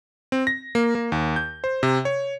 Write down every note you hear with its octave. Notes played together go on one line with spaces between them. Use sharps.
C4
A#6
A#3
A#3
D#2
G6
C5
C3
C#5